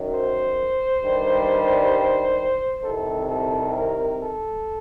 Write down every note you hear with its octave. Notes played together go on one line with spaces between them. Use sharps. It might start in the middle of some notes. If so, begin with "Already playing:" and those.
Already playing: F#2 D#3 F#3
C5
G2 D#3 G3
C2 C3 D#3 A4
A4
A#4
A4